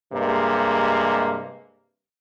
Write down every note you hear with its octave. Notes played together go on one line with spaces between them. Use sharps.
G2 C3 G#3 A#3